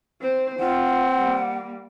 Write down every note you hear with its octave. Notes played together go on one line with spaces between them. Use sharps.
C4 C5
C4 F4 F#5
G3 A#3